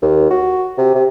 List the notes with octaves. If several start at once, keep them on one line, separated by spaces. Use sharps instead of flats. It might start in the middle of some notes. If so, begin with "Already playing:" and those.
D#2
F#4
C3
C3